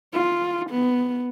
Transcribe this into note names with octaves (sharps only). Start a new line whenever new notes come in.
F4
B3